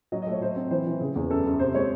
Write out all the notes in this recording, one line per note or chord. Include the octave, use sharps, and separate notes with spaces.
F#3 D#5
D#5
A3
C#5
F#3 C5
C4
E3 C5
E3
C#3
E2
F#2 A4
F#2
C3 C5
G#3 C#5